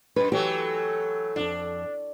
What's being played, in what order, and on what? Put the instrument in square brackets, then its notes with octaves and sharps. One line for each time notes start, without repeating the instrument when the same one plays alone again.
[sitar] F#2 [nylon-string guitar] B4
[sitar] E3 F#3 A3 [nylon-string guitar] G4
[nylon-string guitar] F2 G#2 [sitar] D4